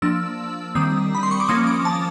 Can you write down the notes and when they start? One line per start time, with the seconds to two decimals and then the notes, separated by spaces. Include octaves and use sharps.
0.02 F3 A#3 D4 E6
0.75 D#3 G3 C4 D#6
1.15 B5
1.23 C6
1.31 C#6
1.40 D6
1.49 F3 A#3 C#4 D#6
1.67 D6
1.85 A5